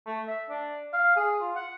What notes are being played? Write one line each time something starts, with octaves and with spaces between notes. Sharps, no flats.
A3
E5
D4
F5
G#4
F4
F#5